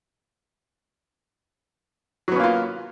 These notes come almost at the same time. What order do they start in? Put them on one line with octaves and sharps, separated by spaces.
F#3 B3 C#4 A#3 F4